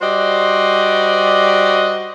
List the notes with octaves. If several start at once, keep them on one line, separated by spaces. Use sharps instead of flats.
G3 F#4 C5 D5 D#5